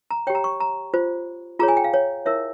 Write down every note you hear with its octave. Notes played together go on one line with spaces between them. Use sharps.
A#5
G4 C#5 G5
A#5
C#6
A#5
F4 C5
F4 G#4 C#5 A#5
G#5
G5
F5
C#5
E4 A#4 C#5 E5